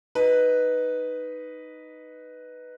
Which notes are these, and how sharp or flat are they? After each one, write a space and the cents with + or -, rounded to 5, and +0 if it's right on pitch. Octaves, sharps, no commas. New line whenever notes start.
D#4 +0 B4 +0